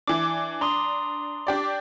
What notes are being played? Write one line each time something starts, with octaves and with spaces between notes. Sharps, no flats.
E3 D4 D6
D4 A#5 C6 D#6
D4 G4 D5